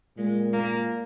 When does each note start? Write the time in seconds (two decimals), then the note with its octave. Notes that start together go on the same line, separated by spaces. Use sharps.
0.18 A#2 G#3
0.53 A#3